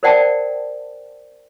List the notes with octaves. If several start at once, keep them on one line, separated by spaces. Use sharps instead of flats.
A#4 C5 D5 F#5 G5 A5